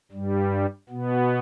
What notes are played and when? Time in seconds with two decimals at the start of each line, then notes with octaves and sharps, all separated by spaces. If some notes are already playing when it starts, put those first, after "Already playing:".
0.12 G2 G3
0.89 B2 B3